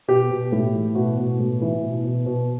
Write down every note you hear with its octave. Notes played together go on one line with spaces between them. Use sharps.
B2 G4
B2
A2
E3
B2 F#4
B2
A2
E3
B2
B2
B2